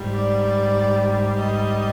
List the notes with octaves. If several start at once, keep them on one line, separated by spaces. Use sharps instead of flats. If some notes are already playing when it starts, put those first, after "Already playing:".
Already playing: G#2 G3
D5
D#5